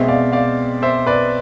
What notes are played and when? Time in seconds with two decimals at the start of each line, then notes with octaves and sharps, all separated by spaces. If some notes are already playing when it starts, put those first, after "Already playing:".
Already playing: B2 G#3 C4 C5 E5
0.08 D5 F5
0.32 D5 F5
0.82 C5 E5
1.06 B4 D5